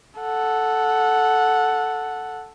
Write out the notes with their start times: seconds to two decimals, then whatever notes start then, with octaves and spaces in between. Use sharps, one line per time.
0.19 A4 F#5